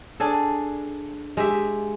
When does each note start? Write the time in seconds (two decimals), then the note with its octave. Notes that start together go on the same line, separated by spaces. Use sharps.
0.20 D4 G#4 A4
1.37 G#3 G4 E5